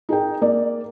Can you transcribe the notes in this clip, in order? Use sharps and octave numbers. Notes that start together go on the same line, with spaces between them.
D#4 G#4 A#4 G5
A#3 D5